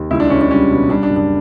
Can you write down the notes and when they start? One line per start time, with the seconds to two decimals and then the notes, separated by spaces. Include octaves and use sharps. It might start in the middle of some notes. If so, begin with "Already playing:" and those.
Already playing: D#2
0.11 C#2 E4
0.20 D4
0.30 C#2 C#4
0.41 D4
0.50 G3 C#4
0.71 B2
0.89 G3 D4
1.03 D4
1.10 F#1
1.16 D4